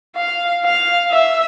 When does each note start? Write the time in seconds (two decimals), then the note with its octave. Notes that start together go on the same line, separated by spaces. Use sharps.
0.16 F5
0.64 F5
1.11 E5